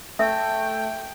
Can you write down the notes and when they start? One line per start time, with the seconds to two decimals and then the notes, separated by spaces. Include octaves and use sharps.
0.19 A3 E5 G5